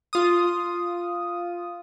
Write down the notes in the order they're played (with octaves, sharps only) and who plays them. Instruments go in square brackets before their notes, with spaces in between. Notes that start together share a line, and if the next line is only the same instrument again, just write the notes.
[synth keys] F4 D#6